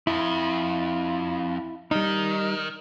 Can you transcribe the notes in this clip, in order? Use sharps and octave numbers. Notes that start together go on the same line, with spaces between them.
F2 E4
D#3 G3 D#4